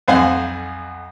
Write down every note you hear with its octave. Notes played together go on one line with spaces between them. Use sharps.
B1 F2 C5 F5 F#5 G#5